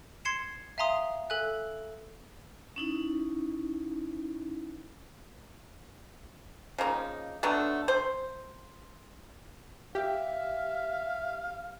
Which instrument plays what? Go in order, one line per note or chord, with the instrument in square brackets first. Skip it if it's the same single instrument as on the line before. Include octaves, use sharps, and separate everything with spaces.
[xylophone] C6 G#6 C7 C#7 E7
E5 F5 G#5 A#5 C6 D#6
A4 E5 G#5 F#6
[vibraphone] C#4 D#4 E4
[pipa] C#3 F3 A#3 D#4
D3 F#3 A3 B3
C5
[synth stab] G4 [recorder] E5 [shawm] F5